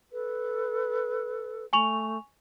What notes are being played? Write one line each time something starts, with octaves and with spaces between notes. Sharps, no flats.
A4 B4
A3 G#5 C#6 F7